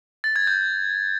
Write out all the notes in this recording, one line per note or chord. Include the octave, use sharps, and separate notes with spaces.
A6
G#6
G6